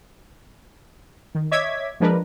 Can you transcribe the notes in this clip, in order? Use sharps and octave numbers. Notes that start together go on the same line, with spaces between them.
D#3
C#5 D#5 E5 D6 G#6 B6
F3 G#3 A#3 D4 A#4 B4